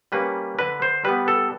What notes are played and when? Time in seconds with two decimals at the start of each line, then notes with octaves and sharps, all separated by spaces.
0.12 G3 A#3 C#4 B4
0.59 D3 B4
0.82 C5
1.04 G3 B3 B4
1.28 A4